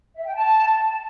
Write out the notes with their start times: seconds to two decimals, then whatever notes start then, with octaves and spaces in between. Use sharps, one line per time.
0.15 E5
0.24 G5
0.34 A5